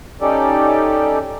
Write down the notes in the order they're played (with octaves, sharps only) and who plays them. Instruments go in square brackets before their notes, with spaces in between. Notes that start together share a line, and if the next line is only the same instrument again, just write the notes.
[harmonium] C#4 D#4 G4 A4 D5